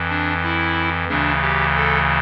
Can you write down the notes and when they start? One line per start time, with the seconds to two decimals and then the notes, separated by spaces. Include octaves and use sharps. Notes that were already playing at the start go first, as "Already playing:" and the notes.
Already playing: F2 E3
0.09 D4
0.43 E4
1.09 D2 C#3 E3 D4
1.42 G4
1.75 A4